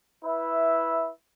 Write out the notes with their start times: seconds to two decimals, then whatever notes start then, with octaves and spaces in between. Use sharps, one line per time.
0.22 E4 B4 E5